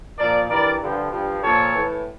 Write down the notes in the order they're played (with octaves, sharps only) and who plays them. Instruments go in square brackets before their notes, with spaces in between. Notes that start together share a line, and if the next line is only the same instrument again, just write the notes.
[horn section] A#2 F3 A#4 D5
G2 E3 A#4 D5
G2 D3 F3
G2 F3
A#2 F3 A4 C#5
A2 E3